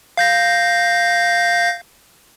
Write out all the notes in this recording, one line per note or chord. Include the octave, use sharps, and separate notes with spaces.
F5 G6 A#6